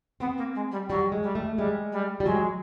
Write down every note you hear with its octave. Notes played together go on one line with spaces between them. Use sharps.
B3 C4
A#3
G#3
G3
F#3 G3
G#3
G3
A3
G3 G#3
G3
G3
F#3 G#3